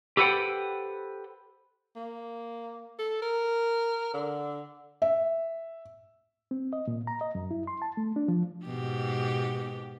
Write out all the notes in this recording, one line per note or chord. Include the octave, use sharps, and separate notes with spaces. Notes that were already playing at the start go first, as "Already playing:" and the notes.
G4 A4 B4 C5 F#5 G5
A#3
A4
A#4
D3
E5
C4
D#5
A#2
A#5
D#5
F#2
E4
C6
A5
A3
D4
F3
G#2 B2 G4